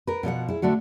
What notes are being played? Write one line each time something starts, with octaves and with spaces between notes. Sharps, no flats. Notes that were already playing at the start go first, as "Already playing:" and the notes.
A#4 B4
B2 F3 D#5 F#5
E4 G#4
D3 A3 D4 F#4